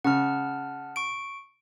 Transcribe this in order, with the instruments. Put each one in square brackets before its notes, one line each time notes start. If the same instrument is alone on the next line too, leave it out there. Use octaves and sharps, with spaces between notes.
[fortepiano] C#3 [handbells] F#5 A5 F6
[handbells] C#6 D7